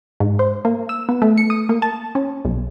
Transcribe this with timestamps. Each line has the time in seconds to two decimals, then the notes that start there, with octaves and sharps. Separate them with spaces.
0.20 G#2
0.39 C5
0.65 A#3
0.89 E6
1.09 B3
1.22 A3
1.38 C#7
1.50 D#6
1.69 A#3
1.82 A5
2.15 C#4
2.45 B1